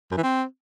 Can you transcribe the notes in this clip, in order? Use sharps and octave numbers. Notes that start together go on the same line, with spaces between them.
F#2
E3
C4